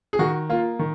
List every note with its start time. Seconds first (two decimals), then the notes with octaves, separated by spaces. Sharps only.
0.13 G#4
0.19 D#3 F#4
0.50 A#3 F4
0.79 D#3